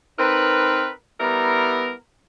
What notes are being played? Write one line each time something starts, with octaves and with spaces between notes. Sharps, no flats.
C4 D#4 A#4 B4
G3 B3 E4 A#4